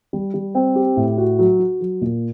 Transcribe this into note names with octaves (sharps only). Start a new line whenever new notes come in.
G3
G3
C4
G4
A2
F#4
F#3
F#4
F#3
A#2